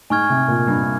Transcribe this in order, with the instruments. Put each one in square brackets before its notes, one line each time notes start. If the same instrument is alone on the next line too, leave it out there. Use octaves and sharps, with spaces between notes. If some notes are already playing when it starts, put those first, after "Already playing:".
[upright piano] G#2 [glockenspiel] G#5 C#6 F6 G#6
[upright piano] C3
A#2
G2